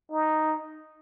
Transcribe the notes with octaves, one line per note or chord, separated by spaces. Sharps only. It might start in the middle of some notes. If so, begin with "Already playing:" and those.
D#4